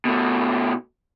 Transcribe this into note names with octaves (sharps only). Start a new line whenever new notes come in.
B2 A3